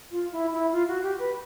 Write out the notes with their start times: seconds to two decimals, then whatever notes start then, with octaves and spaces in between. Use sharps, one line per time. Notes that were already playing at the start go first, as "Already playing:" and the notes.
0.11 F4
0.32 E4
0.52 E4
0.72 F4
0.88 F#4
1.03 G4
1.19 B4